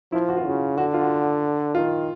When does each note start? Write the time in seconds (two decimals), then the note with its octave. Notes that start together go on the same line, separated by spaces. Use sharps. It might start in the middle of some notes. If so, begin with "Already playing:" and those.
0.12 F3 E4
0.29 F#4
0.37 F4
0.45 C#3 F#4
0.77 D3 F#4
0.94 F4
1.02 F#4
1.75 D#3 F4